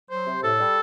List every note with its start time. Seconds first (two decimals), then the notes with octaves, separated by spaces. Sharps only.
0.10 F#3 C5
0.27 C3
0.43 A2 A4
0.59 G3